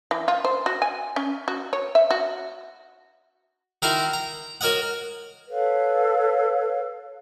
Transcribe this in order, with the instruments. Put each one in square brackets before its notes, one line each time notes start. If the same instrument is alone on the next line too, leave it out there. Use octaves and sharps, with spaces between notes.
[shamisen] E3
F4
C5
F#4
G#5
C#4
F#4
C#5
E5
F#4
[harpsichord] D#3 E4 F#4 A#4 A#5 C6
A#5
F#4 A#4 C#5 D#5 F#5
[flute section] A4 B4 C#5 F5